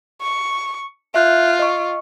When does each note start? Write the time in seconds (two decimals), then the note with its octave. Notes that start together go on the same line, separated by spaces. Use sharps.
0.21 C#6
1.14 F4 E5 F#6 G6
1.59 D#5 C#6